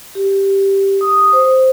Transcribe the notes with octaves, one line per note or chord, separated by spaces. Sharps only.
G4
D#6
C5